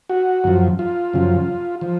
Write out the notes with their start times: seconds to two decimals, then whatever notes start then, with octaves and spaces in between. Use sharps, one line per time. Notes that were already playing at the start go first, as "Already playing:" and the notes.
0.09 F#4
0.44 F#2 F3
0.79 F4
1.13 F#2 C#3 F3
1.81 F3